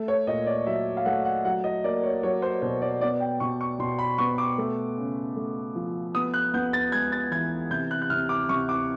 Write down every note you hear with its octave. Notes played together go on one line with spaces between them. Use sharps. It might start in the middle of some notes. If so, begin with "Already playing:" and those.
Already playing: A3
C#5
A#2 D#5
D5
F#3 E5
F5
A3 F#5
F#5
F#3 F#5
D#5
A#3 D5
C#5
F#3 C#5
C5
B2 C5
D5
B3 D5
G5
B2 C#6
C#6
B2 C6
B5
B3 C#6
D6
A3
C#3
A3
F3
B3 D#6
F#6
B3 G6
A6
G#3 G#6
A6
E3 G#6
C3 G6
F#6
F#6
C3 F6
D6
C3 C#6
D6